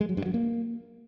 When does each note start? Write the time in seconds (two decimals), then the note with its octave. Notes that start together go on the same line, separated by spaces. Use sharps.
0.01 G#3
0.09 F#3
0.17 G2
0.26 F#3
0.34 A#3